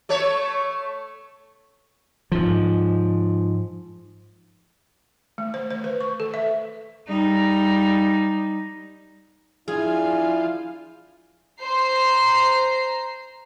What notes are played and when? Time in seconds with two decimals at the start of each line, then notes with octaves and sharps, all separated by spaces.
0.09 A3 A4 C#5
2.32 G#2 F3
5.38 A3
5.54 C5
5.71 C5
5.84 B4
6.01 C#6
6.20 A4
6.34 E5
7.08 G3 D#4
9.68 F3 D4 E4 F4 G#4 G#5
11.61 C5 A#5 C7